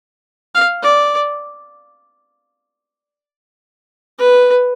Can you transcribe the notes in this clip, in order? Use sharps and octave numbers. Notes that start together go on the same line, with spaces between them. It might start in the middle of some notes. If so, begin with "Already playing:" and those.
F5
D5
B4